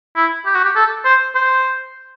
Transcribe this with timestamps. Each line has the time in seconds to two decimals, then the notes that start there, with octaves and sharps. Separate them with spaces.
0.16 E4
0.46 G4
0.55 F#4
0.64 G4
0.76 A4
1.05 C5
1.35 C5